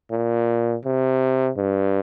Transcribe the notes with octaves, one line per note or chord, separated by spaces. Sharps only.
A#2
C3
G2